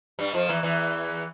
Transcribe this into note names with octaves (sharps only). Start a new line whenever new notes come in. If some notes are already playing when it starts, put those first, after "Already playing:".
G2 G3
F2 F3
E2 E3
E2 E3